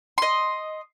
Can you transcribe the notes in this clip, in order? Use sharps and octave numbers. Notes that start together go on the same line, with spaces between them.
D#5 C6